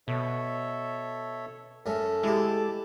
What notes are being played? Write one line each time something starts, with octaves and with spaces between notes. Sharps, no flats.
B2 A4 C#5 E5
F#2 A3 C#4 A4
G#3 E4 G4 A5 D6